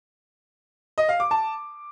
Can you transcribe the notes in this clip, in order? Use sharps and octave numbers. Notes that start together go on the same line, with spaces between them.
D#5
F5
D6
A5